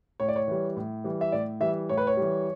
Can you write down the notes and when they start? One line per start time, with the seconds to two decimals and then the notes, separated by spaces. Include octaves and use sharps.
0.20 A2 C#5
0.28 D5
0.36 C#5
0.48 E3 G3
0.76 A2
1.04 E3 G3
1.21 E5
1.32 A2 D5
1.60 E3 G3 E5
1.89 A2 C#5
1.97 B4
2.07 C#5
2.17 E3 G3